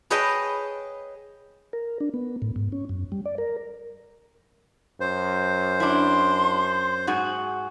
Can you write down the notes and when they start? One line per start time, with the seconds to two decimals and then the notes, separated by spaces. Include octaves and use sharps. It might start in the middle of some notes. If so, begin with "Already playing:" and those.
0.10 G#4 B4 C#5 D#5 G5 A5
1.73 A#4
2.00 D4
2.14 B3
2.42 A2
2.56 G#2
2.72 C#4
2.89 F#2
3.12 G3
3.26 D5
3.38 A#4
5.01 F#2 C5
5.80 D4 E4 C6
7.07 G#2 F#4 G#4